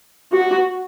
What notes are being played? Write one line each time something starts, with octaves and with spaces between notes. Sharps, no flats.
F#4